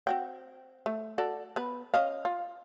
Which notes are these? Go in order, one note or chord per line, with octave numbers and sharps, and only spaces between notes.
C4 F#4 G5
A3
F#4 A4 D5
B3 B4
C#4 D#5 F5
F4